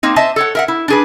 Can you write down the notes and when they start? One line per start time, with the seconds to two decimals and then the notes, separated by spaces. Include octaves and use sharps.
0.03 A#3 C4 D#4
0.16 C5 D#5 E5 A5
0.36 A4 C#5 F#5
0.55 A#4 E5 F#5
0.68 E4
0.88 D4 G#4 B4